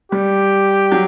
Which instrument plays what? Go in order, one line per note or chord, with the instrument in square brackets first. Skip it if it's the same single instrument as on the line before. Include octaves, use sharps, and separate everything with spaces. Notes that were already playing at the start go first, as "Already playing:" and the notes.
[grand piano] G3 [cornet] G4
[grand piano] F#3